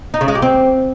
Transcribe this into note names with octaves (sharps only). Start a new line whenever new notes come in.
D#4
C#3
G#3
G4
C4